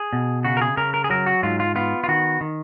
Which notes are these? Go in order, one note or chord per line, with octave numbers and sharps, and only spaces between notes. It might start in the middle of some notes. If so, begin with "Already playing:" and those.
Already playing: G#4
B2
C#3 F#4
A#4
G#4
C#3 A#4
A#4
G#4
F#3 A#4
F#4
G#2 F4
F4
B3 F4
F4
D#3 F#4
D#3